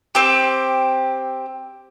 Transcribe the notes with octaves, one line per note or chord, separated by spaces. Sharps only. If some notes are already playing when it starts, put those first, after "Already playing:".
C4 G4